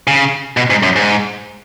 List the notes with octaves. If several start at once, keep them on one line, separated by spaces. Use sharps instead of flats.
C#3
B2
G#2
F#2
G#2